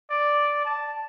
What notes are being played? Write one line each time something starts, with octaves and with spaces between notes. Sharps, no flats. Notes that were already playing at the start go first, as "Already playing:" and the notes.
D5
A5